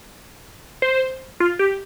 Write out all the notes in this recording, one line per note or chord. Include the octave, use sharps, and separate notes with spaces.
C5
F4
G4